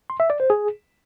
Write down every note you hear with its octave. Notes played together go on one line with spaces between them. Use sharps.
C6
E5
D5
C5
G#4